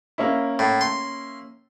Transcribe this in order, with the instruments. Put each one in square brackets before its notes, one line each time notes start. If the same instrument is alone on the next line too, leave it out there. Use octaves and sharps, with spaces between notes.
[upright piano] A#3 C#4 E4
[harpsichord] A2
C6